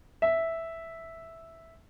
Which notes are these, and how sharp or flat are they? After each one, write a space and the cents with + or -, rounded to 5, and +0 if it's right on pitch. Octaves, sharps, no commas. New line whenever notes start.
E5 -5